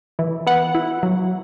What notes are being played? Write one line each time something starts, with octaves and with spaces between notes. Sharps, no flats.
E3
B3 F#5
E4
F#3